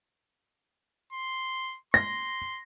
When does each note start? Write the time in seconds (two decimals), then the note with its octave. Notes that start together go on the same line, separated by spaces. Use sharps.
1.13 C6
1.94 C6 A#6